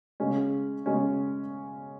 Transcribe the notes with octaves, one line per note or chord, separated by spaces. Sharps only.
C#3 G#3 C#4
C#3 G#3 C#4